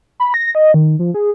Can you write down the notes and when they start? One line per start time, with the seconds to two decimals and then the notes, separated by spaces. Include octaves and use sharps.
0.20 B5
0.34 A#6
0.55 D#5
0.74 D#3
0.99 F3
1.14 G#4